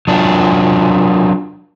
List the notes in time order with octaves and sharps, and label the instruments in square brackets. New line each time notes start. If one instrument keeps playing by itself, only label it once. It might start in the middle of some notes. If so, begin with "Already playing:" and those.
[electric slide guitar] F#3 D4 F4